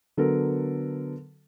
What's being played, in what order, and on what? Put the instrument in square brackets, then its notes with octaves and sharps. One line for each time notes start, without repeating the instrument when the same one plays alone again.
[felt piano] D3 F#3 B3 A4 A#4